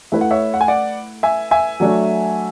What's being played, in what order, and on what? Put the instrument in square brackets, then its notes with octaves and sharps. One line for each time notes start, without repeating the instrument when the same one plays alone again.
[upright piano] A3 E4 B4 [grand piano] E5
[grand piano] F#5
C#5 E5
F#5
G#5
D5 F#5
E5 G#5
E5 G#5
[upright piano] F#3 A3 D4 F#4